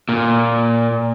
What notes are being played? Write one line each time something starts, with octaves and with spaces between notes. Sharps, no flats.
A#2